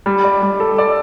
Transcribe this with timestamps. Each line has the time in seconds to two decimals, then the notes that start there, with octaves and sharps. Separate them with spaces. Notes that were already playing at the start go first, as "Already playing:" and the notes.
0.06 G3
0.24 D5
0.42 G3
0.60 A4
0.78 D5